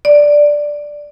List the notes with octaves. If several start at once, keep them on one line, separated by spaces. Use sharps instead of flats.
D5